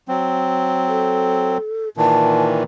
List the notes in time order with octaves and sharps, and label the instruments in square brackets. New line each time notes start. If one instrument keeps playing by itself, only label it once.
[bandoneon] F#3 C4
[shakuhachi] A4
[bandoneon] A#2 D#3 E3 [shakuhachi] A5